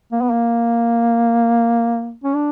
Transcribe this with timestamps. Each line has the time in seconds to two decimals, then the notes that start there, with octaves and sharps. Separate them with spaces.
0.12 A#3
0.21 B3
0.30 A#3
2.24 C#4
2.35 D4